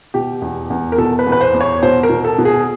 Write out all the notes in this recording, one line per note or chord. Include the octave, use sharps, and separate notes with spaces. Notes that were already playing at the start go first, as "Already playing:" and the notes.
B2 G4
E2
E2
A#4
B2 A4
B4
E2
B4
C5
E2
C#5
B2 C5
A#4
B2
A4
B2
G#4